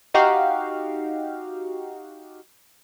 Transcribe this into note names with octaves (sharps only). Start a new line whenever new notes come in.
D#4 F#4 G4 F5